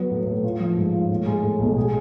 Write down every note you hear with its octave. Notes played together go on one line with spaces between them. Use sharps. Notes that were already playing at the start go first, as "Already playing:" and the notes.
Already playing: F#3 B3
A2
A2
F4
F3
G#2
F4
A2
G#3
A2
B1
G#4